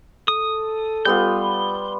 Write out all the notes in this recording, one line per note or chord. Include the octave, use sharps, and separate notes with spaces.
A4 D#6
G3 B3 F4 G6